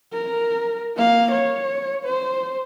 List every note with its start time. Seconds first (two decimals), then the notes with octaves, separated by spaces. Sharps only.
0.13 A#4
0.96 A#3 F5
1.31 C#5
2.05 C5